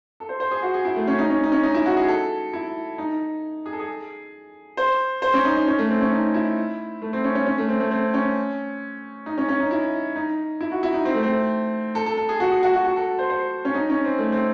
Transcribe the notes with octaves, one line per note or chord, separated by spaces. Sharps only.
A4
C5
C5
G#4
F#4
G#4
E4
A3
C#4
D#4
C#4
D#4
C#4
D#4
E4
F#4
G#4
A4
E4
D#4
G#4
A4
G#4
C5
C5
C#4
D#4
D#4
C#4
A3
C4
C#4
D#4
E4
A3
C4
C#4
C#4
C#4
A3
C4
A3
C4
C#4
D#4
C#4
C#4
D#4
E4
D#4
E4
F#4
E4
D#4
C4
A3
C4
A4
A4
A4
G#4
F#4
G#4
F#4
F#4
F#4
A4
C5
C5
C#4
D#4
C#4
C4
A3
C4